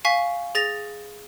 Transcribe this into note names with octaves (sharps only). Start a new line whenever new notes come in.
F5 G#5 C#6 B6
G#4 A6 A#6 F7